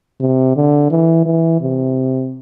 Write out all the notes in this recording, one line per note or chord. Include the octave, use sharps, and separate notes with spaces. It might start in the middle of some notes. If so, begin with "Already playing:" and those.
C3
D3
E3
E3
C3